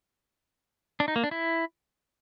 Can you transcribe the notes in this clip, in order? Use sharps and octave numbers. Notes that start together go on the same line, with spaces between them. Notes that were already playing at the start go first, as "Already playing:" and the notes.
D4
D#4
A#3
D4
E4